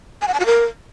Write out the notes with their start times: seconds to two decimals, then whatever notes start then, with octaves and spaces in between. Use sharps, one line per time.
0.22 G#5
0.28 F#5
0.34 A5
0.40 F#4
0.46 A#4